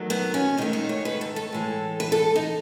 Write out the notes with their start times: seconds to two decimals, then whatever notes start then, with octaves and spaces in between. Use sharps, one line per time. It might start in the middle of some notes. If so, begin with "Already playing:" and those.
Already playing: E2 D#3 F#3 A3
0.10 B3
0.34 C#4
0.58 G#2 D#3 A3 D#4
0.73 D#4
0.89 C#5
1.05 B4
1.21 A4
1.36 A4
1.52 A2 E3 G#3
2.00 B4
2.12 A4
2.36 D#4